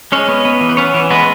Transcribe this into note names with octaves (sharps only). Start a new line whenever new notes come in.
G#3 C#4 C#5
B3
B3
E3
B4
B3 C#4 C#5
E3
G#3 B3 B4